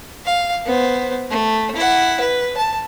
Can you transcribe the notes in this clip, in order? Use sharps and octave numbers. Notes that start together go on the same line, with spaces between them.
F5
B3 C5
A3
E4 F#5
B4
A5